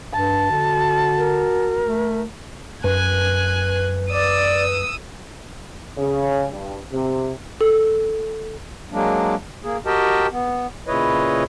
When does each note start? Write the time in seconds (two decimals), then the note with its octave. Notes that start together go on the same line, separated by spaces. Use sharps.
0.13 G2 A5
0.51 D3 F#4
1.18 A#4
1.82 A3
2.84 F#2 B4 G#5 F#6
4.10 D5 D#6 E6
5.97 C#3
6.50 G2
6.93 C3
7.61 A4
8.92 F#3 G#3 A#3 D4
9.64 A#3 G#4
9.86 F#4 G4 A#4 D#5 G5 A5
10.32 B3
10.87 A#2 C#3 E4 B4 C#5 D#5